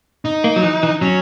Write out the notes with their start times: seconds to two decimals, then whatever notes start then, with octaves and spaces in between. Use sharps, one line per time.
0.25 D#4
0.44 A#3
0.56 F#3
0.63 E3
0.83 E3
1.01 F#3 C#4